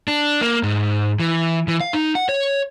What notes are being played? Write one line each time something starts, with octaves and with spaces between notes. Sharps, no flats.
D4
A#3
G#2
E3
E3
F5
D#4
F#5
C#5